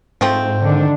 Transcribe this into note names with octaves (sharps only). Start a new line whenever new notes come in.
G#2 F3 A3 C4
D3 D#3 D4